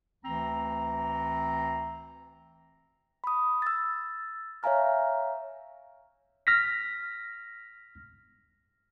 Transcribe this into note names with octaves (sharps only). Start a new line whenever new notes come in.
D2 E3 A3 C4 A#5
B5 D#6
E6 A6
C#5 E5 F5 G#5 A#5 F6
F6 A#6 B6